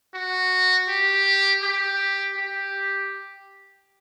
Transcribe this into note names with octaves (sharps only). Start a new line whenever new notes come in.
F#4
G4
G4
G4